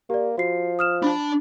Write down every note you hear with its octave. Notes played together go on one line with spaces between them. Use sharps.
A#3 G4 D5
F3 F#4 C7
D#6 F6 E7
D4 A5 B5